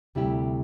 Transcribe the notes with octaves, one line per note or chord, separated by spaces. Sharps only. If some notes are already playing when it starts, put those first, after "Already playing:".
D2 C3 G3 E4 G4